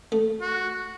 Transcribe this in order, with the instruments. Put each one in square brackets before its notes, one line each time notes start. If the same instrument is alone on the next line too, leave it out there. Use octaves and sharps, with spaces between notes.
[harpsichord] A3
[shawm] F#4